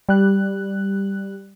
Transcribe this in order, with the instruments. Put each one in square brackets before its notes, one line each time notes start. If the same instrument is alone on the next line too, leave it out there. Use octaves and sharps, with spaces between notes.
[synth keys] G3 F#6